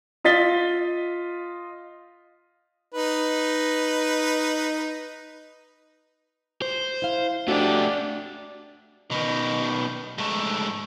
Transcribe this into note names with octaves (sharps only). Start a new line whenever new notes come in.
F4 D#5 A6 B6 G7
D#4 B4
C5
E4 F5
A3 D4 F#4 G4
B2 D#3
G#2 A3